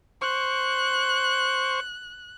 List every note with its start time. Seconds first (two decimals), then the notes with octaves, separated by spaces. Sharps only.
0.22 C5 C#6 F#6